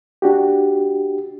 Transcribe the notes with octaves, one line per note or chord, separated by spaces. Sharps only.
D4 F#4 G4